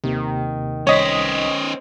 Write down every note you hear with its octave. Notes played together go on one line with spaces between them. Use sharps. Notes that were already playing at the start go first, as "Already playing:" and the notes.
D#2 C3 D#3
C2 C#4 C5 C#5 D#5 B6